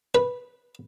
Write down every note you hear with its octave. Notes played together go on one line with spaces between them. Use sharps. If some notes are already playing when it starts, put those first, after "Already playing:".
B4